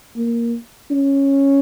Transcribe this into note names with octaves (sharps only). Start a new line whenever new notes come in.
A#3
C#4